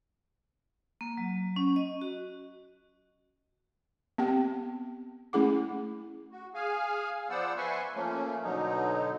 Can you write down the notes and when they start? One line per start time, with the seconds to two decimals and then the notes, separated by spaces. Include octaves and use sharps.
1.01 A#3
1.17 F#3
1.56 C#4
1.76 D#5
2.01 F#4
4.18 B3 C4 G4 G5
5.33 A3 C#4 E4 G#4 F#5 D6
6.32 F#4
6.54 G#4 F5 G#5
7.30 F3 B3 C5 D5 F#5 E6
7.57 B4 E5 G#5 C6 C#6
7.94 F3 A3 A#3 C#4
8.43 B2 D3 F#3 D#4